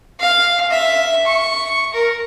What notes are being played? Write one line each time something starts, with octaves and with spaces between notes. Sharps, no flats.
F5
E5
C#6
A#4